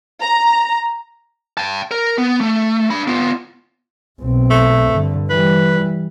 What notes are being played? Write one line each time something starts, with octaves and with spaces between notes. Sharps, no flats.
A#5
G5 A5
A#4
B3
A3
D4 B5
B3 F4
B1 C4
A3
G2 D3
E3 G3 B4